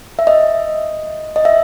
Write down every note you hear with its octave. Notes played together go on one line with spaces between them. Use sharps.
E5
D#5
D#5
E5